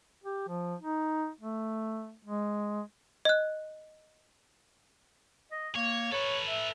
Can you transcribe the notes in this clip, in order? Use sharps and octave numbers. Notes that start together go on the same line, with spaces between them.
G4
F3
D#4
A3
G#3
D#5 F#6
D#5
A#3 C#5
A4 B4 C#5
E5